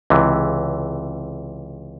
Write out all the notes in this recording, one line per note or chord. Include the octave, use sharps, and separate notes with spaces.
C#2 C3 E3